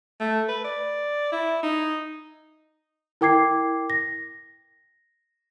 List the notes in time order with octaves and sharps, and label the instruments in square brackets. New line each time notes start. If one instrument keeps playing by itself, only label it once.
[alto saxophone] A3
B4
D5
E4
D#4
[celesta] E4 A#4 G5 D6 G#6 C7
A#6